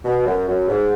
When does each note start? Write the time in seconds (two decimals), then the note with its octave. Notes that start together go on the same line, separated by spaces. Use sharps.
0.05 B2
0.26 F#2
0.48 F#2
0.68 G#2